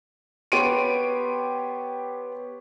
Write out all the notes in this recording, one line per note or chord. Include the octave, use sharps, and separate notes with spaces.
B3 G4 C#5 C6 D7 D#7